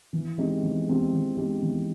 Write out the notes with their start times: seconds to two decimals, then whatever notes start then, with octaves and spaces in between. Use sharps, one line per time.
0.13 E3
0.38 G#3 C4 D#4 G4
0.63 E3
0.87 G#3 C4 D#4 G4
1.13 E3
1.37 G#3 C4 D#4 G4
1.62 E3